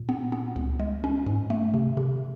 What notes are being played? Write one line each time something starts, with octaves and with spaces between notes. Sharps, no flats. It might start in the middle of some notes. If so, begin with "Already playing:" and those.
Already playing: A#2
B3
B3
C#2
G#3
C#4
G#2
A3
C3
C3